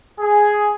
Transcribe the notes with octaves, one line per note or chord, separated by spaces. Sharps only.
G#4